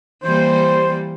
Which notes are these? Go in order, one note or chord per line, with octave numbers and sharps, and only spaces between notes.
E3 G3 A#3 C5